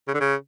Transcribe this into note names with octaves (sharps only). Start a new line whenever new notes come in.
C#3
D3
C#3